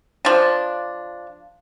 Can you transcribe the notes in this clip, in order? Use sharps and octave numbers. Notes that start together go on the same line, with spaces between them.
F3 D4